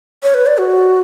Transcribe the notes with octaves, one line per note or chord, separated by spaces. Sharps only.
C#5
B4
D5
F#4